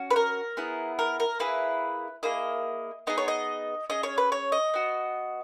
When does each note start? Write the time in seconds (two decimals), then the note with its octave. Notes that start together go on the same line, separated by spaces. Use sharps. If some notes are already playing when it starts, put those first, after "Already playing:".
Already playing: C#4 F#4
0.11 B4
0.16 A#4
0.57 B3 E4 G#4
0.99 A#4
1.20 A#4
1.40 A#3 E4 G#4 B4
2.23 A#3 E4 G#4 D#5
3.07 B3 D#4 G#4 D#5
3.18 C#5
3.28 D#5
3.90 C#4 G#4 D#5
4.03 C#5
4.18 B4
4.32 C#5
4.52 D#5
4.74 B3 F#4